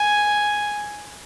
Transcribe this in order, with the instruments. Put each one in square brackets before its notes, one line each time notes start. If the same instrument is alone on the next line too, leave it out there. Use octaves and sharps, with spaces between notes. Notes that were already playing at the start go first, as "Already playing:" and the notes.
Already playing: [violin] G#5